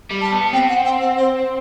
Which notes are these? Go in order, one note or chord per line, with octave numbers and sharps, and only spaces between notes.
G3
A5
B3
C4 G5
F#5
G5
F#5
C5